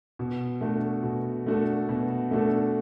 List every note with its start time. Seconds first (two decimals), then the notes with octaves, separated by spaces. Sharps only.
0.19 B2
0.61 A3 D4 F#4 A4
1.03 B2
1.46 A3 D4 F#4 A4
1.89 B2
2.31 A3 D4 F#4 A4